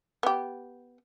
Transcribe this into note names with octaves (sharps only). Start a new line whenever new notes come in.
B3 G4